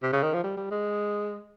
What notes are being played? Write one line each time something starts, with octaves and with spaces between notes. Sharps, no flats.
C3
C#3
D#3
F3
G3
G3
G#3